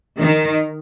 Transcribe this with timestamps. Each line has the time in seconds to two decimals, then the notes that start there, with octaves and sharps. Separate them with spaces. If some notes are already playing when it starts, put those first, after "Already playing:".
0.19 D#3